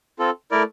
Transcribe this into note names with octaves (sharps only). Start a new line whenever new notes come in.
C4 F4 A4
A3 E4 A#4 D5